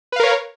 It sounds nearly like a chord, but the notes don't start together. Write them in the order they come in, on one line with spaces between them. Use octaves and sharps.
B4 F5 A#4 C#5